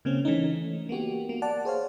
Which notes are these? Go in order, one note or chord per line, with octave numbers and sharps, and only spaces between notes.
C#3 A#3 C4 C#4
E3 A3 C#4 D#4
A#3 B3 F#4 G4
A#3
D5 F#5 A5
G#4 C5 C#5 F5